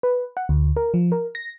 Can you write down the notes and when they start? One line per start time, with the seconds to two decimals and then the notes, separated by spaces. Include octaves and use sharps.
0.03 B4
0.37 F#5
0.49 D2
0.77 A#4
0.94 F3
1.12 A#4
1.35 A#6